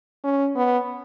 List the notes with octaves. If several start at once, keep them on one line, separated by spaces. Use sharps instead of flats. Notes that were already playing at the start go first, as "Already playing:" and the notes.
C#4
B3